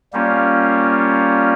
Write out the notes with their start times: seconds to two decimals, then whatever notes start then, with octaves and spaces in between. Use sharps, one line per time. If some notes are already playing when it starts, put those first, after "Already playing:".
0.13 G3 A#3 C#4 F4